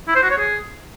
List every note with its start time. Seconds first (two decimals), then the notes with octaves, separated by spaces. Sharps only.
0.08 E4
0.15 C5
0.23 F#4
0.30 C#5
0.38 G#4